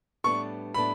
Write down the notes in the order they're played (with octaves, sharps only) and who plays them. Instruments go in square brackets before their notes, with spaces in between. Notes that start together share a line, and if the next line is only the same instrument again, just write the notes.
[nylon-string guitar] A2 G3 B3 D4 A4 [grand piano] C#6
[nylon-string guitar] A2 G3 B3 D4 A4 [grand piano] B5